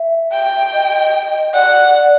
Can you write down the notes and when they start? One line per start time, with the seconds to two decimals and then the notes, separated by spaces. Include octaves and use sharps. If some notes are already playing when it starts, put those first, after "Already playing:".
Already playing: E5
0.32 G5
0.73 D#5
1.54 D5 F#5